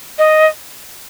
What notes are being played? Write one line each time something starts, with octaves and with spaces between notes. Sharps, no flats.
D#5